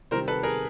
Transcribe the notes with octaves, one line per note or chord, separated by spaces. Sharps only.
C3 D#3 G3 A#4 C5
A4 B4
G#4 A#4